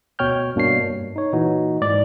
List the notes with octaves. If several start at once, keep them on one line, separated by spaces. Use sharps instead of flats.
D2 B2 C#5 G5 F6 G6
G2 B2 A#3 D4 C#5 C7
G2
D#4 C#5
A#2 E3 D#4 F#4
G#2 D5